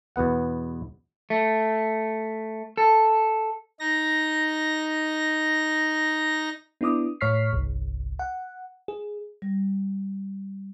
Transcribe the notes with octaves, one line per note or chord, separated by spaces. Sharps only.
E2 B2 B3 F#5
A3
A4
D#4 A#6
B3 D4 E4 D6 D#6
A2 C#5 C#6 F6 B6 C7
G1 C2
F#5
G#4
G3